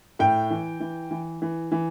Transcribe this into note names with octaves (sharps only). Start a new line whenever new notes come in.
A2 G5
E3
E3
E3
E3
E3